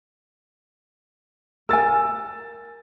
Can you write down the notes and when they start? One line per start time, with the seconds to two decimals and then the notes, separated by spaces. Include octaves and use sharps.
1.69 A#4 G#5 E6 A6